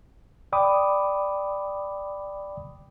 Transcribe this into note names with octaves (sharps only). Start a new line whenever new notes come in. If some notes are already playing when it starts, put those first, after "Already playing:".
D5 G5 B5 D6 D#6